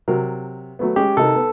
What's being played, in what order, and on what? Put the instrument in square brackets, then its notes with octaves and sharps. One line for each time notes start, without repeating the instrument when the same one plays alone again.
[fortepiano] C3 F#3 A#4
F#3 A3 B3
[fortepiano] G#3 C#4 G#4 [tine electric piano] G4
[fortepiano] C3 D#4 A#4 [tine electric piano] A4
[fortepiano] B3